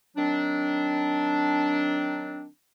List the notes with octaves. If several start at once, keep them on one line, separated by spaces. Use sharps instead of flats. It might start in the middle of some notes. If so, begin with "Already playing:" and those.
D#3 F#3 C4 D4